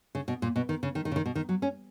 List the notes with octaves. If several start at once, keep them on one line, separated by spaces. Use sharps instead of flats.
C#3
B2
A#2
B2
D#3
C#3
D#3
D#3
C#3
D#3
B2
D#3
F#3
C#4